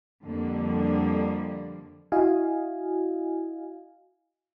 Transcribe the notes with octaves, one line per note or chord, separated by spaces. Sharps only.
F2 D3 F3 G3 A#3
E4 F#4 D#5 F5 G#5